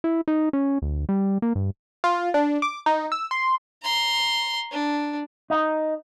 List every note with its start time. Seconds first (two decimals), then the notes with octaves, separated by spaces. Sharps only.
0.04 E4
0.28 D#4
0.53 C#4
0.82 D2
1.09 G3
1.42 A#3
1.55 G2
2.04 F4
2.34 D4
2.62 D6
2.86 D#4
3.12 E6
3.31 C6
3.83 A#5 C6
4.71 D4
5.50 D#4